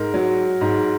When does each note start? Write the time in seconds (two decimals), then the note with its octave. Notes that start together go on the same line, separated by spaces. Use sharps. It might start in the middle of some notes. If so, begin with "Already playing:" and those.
Already playing: G#2 A#4
0.14 F#3
0.61 G#2